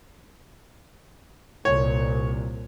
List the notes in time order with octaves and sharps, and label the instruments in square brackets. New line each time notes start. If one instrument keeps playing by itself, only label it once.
[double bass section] C2 A#2 [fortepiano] C#5